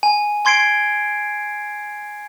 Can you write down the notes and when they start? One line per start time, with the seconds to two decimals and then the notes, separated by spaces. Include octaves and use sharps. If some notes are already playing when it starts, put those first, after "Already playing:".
0.03 G#5
0.45 G#5 C6 G#6 C7 D7